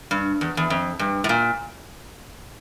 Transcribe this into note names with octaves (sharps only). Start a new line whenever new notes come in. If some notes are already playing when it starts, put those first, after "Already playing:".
G2
E2
E2
F2
G2
A2
A#2